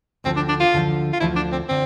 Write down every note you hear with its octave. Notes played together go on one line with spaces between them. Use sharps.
D2 D3 F3 C4
D4
D4
F4
D2 D3 F3
F4
D2 D3 F3 E4
D4
C4
D3 C4